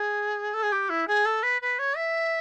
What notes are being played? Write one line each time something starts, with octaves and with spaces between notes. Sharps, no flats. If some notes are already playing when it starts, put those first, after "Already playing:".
Already playing: G#4
A4
G#4
G4
E4
G#4
A4
B4
B4
C#5
E5